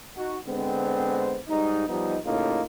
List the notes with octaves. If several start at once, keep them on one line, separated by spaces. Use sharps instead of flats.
D#4 F#4
D3 G#3 B3 C4
G#2 G3 D#4
F3 G3 B3 D#4
A2 C#3 A#3 D#4 F4